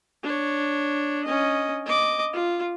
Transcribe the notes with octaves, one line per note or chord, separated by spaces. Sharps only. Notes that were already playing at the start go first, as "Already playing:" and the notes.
D4 C#5
C#4 D#5
D#5 D6
F4